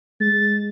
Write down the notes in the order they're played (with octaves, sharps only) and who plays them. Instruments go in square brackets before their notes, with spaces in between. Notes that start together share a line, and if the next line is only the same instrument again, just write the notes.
[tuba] G#3 [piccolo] A6